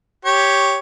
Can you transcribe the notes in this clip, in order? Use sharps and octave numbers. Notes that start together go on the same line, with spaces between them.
G4 C#5